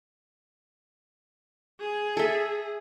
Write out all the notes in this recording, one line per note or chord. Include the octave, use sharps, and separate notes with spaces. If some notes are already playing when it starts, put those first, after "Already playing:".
G#4
A4 E5